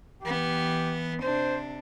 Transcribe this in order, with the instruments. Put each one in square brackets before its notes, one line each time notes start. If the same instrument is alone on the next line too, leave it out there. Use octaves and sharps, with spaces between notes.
[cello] E3 B3 [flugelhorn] G4
[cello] C3 D4 [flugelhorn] C5